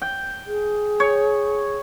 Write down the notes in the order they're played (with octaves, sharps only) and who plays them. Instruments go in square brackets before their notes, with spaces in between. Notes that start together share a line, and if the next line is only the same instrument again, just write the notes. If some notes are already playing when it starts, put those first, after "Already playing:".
[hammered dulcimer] G5
[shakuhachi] G#4
[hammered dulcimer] C#5